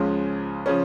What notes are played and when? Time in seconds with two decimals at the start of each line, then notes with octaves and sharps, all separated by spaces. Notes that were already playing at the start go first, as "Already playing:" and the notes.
Already playing: C#2 C#3 F3 G#3 C#4
0.66 C#3 F3 C#4